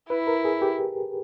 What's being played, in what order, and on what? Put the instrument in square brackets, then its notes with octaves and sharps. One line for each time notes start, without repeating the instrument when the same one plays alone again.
[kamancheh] E4 [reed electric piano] B4
[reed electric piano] A#4
G#4
G4